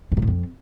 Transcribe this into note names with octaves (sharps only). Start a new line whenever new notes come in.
G2
G#2
A2
F2